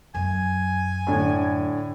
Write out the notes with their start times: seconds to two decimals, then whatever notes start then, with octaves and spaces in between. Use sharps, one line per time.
0.15 F#2 G#5
1.07 A2 D3